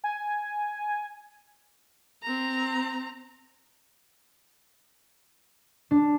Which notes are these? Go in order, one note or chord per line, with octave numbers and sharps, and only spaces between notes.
G#5
C4 A#5
D4